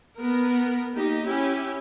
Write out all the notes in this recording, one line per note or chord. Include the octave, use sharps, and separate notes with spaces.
B3 A#4
A#3 D#4 G4
C#4 E4 G4